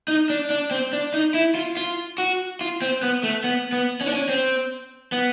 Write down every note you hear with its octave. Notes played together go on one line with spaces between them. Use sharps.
D#4
D4
D4
C4
D4
D#4
E4
F4
F4
F#4
F4
C4
B3
A3
B3
B3
C#4
D4
C#4
C4
B3